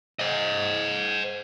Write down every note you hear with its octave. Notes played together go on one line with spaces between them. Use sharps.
C5 D#5